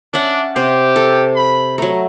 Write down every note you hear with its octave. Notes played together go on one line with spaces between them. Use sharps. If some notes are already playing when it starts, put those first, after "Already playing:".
C#4 D4 E5 F#5
C3 G4 C5
A4
B5
F#3 A3 A#5